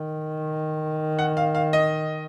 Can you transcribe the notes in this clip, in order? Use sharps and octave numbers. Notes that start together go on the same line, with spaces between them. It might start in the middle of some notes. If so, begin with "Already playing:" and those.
Already playing: D#3
F#5
F5
F5
D#5